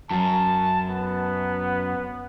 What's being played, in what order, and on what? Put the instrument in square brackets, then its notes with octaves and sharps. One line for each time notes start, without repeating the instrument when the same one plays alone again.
[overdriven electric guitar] F#2 [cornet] A5
[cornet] B3